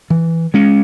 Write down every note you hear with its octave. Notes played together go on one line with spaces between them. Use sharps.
E3
G#3 C#4